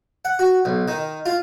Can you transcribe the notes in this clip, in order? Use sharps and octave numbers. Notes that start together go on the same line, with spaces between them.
F#5
F#4
B1
D#3
F4